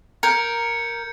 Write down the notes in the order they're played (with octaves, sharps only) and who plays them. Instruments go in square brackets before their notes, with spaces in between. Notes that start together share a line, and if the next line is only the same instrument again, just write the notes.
[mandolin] A#4 [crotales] G6 G#6 C#7